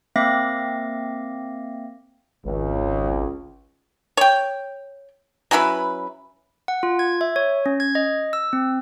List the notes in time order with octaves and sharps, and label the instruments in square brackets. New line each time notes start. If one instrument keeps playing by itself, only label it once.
[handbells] A#3 C4 E5 F5 D6 A#6
[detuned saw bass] G#1 [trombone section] C#2
[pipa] C#5 G5
F#3 C#4 E4 B4
[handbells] F#5
F4
G#6
E5
C#5
C#4
G#6
D#5
E6
C4